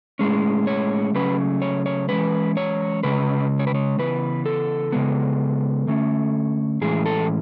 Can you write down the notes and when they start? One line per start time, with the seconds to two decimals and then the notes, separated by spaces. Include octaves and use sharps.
0.19 A2 G#3 C#4
0.67 C#5
1.15 C#3 F#3 A3 C#4 B4
1.62 C#5
1.86 C#5
2.09 E3 G#3 C#4 B4
2.57 C#5
3.03 C#3 G#3 C#4 B4
3.59 C#5
3.67 B4
3.75 C#5
3.98 C#3 E3 B3 B4
4.46 A4
4.92 C#3 G#3 B3
5.87 D3 A3 C#4
6.81 A2 E3 G#3 C#4 G#4
7.06 A4